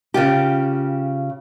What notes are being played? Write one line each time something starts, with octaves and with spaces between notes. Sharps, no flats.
C#3 F4 G4